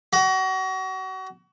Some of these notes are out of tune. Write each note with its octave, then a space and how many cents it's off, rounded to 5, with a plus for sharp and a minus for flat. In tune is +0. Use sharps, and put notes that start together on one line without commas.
F#4 +30